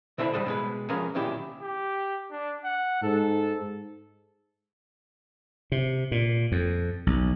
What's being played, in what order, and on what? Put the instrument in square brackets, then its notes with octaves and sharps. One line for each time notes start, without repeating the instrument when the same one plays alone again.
[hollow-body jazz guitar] B2 D3 E4 C5 A5 B5
C#2 G#2 G3 D4 C5 D#5
B2 G#3 B4
F3 C#4 G#4 A#4 B4
B1 A#2 D#3 C#4 E4 G4
[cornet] G4
D4
F#5
[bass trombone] G#2 [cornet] A4
[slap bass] C3
A#2
F2
B1